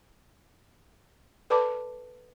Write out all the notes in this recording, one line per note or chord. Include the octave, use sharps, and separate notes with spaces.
A4 B4 D5 A5 B5 D6